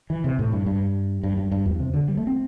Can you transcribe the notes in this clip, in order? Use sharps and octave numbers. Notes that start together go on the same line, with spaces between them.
E3
C3
A2
G2
G2
G2
G2
G2
E2
C3
D3
G3
A3
C4